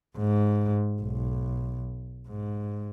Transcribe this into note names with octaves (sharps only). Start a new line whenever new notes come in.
G#2
B1
G#2